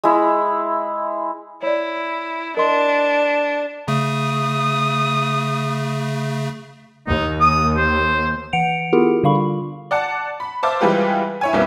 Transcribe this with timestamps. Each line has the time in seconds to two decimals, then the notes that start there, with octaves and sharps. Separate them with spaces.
0.04 G#3 E4
1.63 E4 C#5 D5
2.57 D4 A#4 D#5 C6
3.88 C#3 A3 D#6
7.07 D#2 D#4
7.40 D#6
7.77 C5
8.53 E3 F#5 C#7 D7 F7
8.93 B3 E4 F4 G4 G#4 A#4
9.23 D3 G3 D4 F5 B5 C#6
9.35 F4
9.91 D5 F#5 A5
10.40 B5
10.63 C5 E5 F5 A5 D6
10.81 E3 G3 G#3 F4 G4 B4
11.41 E4 C#5 G#5
11.53 B1 F2 G3 A#3 E4 B4